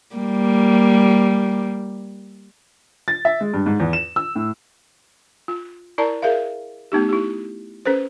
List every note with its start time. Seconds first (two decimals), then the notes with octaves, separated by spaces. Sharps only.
0.16 G3 A#3
3.08 A6
3.25 E5
3.41 G#3
3.54 G2
3.66 G#2
3.80 E2
3.93 E7
4.16 E6
4.35 A2
5.48 F4
5.98 E4 A#4 D5 A5 A#5
6.22 G#4 A#4 E5 F5
6.92 A3 B3 D#4 G4
7.09 E4 G4
7.85 C#4 A4 B4 C5